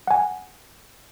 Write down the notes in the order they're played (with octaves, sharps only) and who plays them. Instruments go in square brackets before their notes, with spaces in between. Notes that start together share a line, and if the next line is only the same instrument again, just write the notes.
[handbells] F#5 G#5